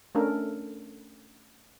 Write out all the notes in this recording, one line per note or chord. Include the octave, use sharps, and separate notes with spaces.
A3 C#4 D4 A4 A#4